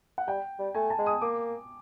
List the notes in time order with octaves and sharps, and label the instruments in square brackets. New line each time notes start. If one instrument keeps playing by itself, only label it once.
[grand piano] F#5
[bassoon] G3 [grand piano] G5
[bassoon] G3
[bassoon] A3 [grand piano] G#5
[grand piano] A5
[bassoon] G#3
[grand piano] D#6
[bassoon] A#3 [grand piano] D6